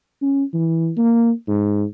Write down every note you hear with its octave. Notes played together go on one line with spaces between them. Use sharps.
C#4
E3
A#3
G#2